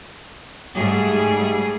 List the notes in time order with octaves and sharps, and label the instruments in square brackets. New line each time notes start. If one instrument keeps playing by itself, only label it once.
[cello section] G#2 G3 A3 G#4